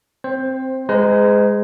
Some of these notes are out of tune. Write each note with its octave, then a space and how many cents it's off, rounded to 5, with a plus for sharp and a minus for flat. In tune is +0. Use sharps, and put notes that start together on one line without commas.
C4 +0 C5 +15
G#3 +0 C5 -45 A#5 +0